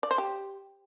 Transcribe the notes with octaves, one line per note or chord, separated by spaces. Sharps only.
D5
C5
G4